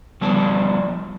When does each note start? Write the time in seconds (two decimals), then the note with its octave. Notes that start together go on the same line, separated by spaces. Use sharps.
0.21 F3 G3 B3 D4 D5 A5